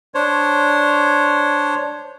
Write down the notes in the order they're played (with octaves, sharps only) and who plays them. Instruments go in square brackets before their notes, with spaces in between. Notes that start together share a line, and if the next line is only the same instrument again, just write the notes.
[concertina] D4 C5 C#5